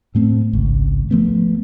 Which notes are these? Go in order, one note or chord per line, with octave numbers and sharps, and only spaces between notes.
A2 A3 C4
G#1 C#2
F3 A3 B3